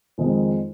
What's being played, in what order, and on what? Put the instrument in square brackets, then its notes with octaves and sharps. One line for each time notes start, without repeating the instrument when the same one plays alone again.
[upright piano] F2 D#3 G#3 D#4